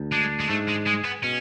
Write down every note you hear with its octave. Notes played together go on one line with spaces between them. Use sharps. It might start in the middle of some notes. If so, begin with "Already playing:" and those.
Already playing: D2
G#3 D4
G#3
G#2 A3
G#3
G#3 G#4
B3
B2 C#4